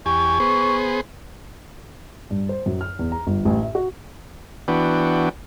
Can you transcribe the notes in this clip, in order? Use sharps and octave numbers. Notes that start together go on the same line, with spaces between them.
E2 G4 G#5 C#6
B3 G#4 C5
G2
C5
F#2
F6
E2
A#5
G1
A1
E5
F#4
E3 B3 D4 F#4 G5